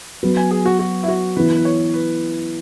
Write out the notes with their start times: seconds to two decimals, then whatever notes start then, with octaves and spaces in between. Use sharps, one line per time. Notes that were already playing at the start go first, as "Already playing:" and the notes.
0.23 F#3 B3 F#4 B4
0.37 G#5
0.51 G#4
0.65 F#4
0.79 F#4
1.03 E4
1.08 F#4
1.36 E3 B3 E4 B4
1.57 B4
1.65 C#5
1.94 B4